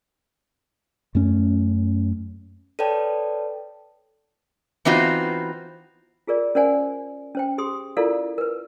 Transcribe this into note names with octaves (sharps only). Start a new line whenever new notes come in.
F#2 A3 C#4
A4 B4 C#5 D5 G5 A5
E3 B3 C4 D#4 F4 F#4
F4 G#4 A#4 D5
C#4 A#4 C5 D5 F#5 G#5
C#4 C5 G5
G4 G#4 C6 D#6
E4 F4 A4 A#4 D5 F5
A#4 B4